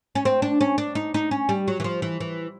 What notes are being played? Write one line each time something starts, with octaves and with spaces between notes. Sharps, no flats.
C#4
C4
D4
C#4
D4
D#4
D#4
C#4
G3
F#3
E3
F3
E3
E3